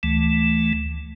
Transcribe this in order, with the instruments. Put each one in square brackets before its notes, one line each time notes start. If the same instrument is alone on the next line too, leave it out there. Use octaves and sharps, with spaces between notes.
[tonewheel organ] D2 E3 A3